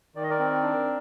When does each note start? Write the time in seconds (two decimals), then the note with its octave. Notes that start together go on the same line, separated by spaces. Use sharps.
0.15 D#3 D5
0.23 D#5
0.30 A#4 D5
0.39 C4
0.63 D4